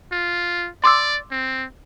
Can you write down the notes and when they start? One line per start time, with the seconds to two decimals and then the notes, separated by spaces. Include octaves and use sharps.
0.12 F4
0.84 D5 C6 D6 E6
1.31 C4